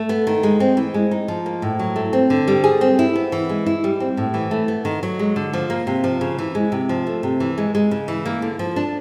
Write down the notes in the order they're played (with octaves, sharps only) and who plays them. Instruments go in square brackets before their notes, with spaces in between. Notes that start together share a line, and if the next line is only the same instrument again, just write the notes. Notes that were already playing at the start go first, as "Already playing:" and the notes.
Already playing: [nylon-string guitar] A3
B3
D#3
G#3
C4
E3
G#3
D#4
F3
A#3
A2
F#3
A3
C4
D3
G3
G#4
C4
E4
B3
E3
G#3
E4
G3
C4
A2
E3
A3
B3
D#3
F#3
G#3
D3
F3
A#3
C3
F3
C#3
E3
G#3
C3
F3
A3
C3
E3
G#3
G#3
C#3
E3
A#3
D3
F3
D4